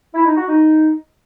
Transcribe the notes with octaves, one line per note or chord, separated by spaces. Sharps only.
E4
D#4
F#4
D#4